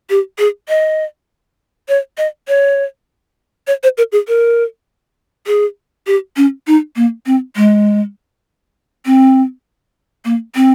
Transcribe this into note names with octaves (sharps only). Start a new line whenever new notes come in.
G4
G#4
D#5
C#5
D#5
C#5
C#5
C5
A#4
G#4
A#4
G#4
G4
C#4
D#4
A#3
C4
G#3
C4
A#3
C4